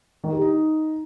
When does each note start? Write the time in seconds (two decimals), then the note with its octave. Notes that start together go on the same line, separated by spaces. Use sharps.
0.24 D#3
0.32 G4
0.41 D#4